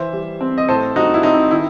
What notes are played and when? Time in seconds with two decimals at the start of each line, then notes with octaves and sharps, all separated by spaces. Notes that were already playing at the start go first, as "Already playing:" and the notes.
Already playing: E3 C5 E5
0.13 G3
0.41 C4
0.58 D#5
0.68 A2 A4 C5
0.96 G3 D#4 F#4
1.14 E4
1.23 C4 D#4
1.51 D#3 E4